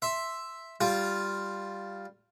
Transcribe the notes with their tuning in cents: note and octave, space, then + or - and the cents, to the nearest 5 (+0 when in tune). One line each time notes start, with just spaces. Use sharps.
E5 +0 C6 +5
G3 +0 F4 +0